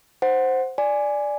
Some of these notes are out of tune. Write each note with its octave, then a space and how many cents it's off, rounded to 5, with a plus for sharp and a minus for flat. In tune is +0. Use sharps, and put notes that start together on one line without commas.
C5 +0 F#5 +0
D5 +0 G#5 +0